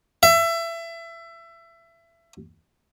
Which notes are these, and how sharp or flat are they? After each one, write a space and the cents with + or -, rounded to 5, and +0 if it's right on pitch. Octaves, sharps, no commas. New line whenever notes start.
E5 +25